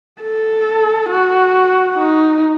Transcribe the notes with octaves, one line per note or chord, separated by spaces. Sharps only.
A4
F#4
D#4